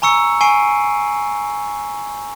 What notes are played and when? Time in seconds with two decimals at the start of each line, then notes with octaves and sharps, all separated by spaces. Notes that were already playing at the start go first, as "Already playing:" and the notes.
0.02 G#5 A#5 C#6 E6 C#7
0.41 G#5 C#6 C7 D7 D#7